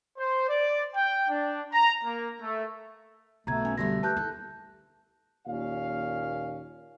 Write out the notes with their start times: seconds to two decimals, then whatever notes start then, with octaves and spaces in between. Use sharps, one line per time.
0.17 C5
0.48 D5
0.95 G5
1.29 D4
1.72 A#5
2.04 A#3
2.40 A3
3.47 B1 B2 A3 A#5 G#6
3.65 C#4
3.77 D3 G3 A3 B3 G4 A#6
4.03 G4 B4 C5 A5 F#6 G6
4.16 D#4 E4 A4
5.47 D#2 A#2 C#4 F5